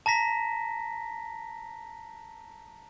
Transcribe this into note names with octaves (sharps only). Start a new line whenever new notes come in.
A5 A#5 A#6 B6